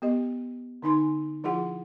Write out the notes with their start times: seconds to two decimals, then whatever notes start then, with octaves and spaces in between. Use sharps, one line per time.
0.02 B3 G4 D#5
0.82 D3 D#4 G#5 C6
1.44 F3 E4 F4 G#4 F#5